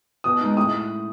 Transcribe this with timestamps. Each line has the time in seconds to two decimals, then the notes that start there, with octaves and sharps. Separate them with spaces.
0.24 B2 D#6
0.41 G#3 D#4
0.57 A2 D#6